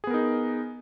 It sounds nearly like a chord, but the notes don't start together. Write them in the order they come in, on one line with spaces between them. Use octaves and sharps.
G#4 B3 A#4 D#4